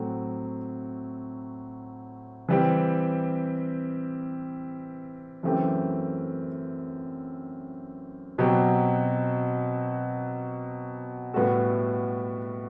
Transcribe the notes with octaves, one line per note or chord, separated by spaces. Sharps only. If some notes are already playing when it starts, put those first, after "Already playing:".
Already playing: A2 F#3 A3 C4
E3 G3 C4 G4
F#2 E3 A3 C4 G4
B2 F#3 C4 G4
A2 G3 B3 F#4 A4